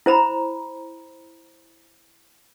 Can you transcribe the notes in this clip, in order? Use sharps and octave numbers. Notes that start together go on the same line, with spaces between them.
E4 C5 A#5 B5